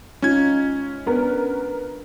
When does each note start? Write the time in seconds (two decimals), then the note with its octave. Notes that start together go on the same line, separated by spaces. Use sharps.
0.22 G#3 C#4 D#4 F4 G#6
1.07 B3 D4 A#4